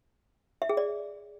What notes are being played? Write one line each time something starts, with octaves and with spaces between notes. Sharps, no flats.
E5
G#4
D5